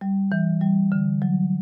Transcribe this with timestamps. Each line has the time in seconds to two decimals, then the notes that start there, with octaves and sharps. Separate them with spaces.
0.01 G3
0.32 E3
0.61 G3
0.92 D3
1.22 F#3